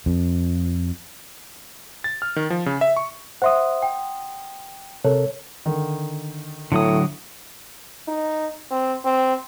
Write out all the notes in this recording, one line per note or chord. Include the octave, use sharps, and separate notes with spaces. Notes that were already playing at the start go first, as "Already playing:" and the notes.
F2
A6
F6
D#3
F3
C#3
E5
C#6
C5 E5 F#5 C6 D#6
G5
C3 A4 A#4 C#5
D3 D#3
A2 D3 F#3 D#6
D#4
C4
C4